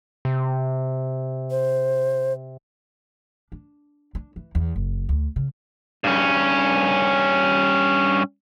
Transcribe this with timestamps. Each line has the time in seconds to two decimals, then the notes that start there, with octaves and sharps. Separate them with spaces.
0.25 C3
1.51 C5
3.52 D4
4.15 D4
4.36 E3
4.55 E2
4.76 F#1
5.09 D2
5.36 C#3
6.04 G2 C#4